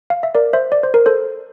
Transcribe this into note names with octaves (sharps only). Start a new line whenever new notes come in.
F5
E5
A#4 D5
C5 E5
D5
C5
A#4
A4 C5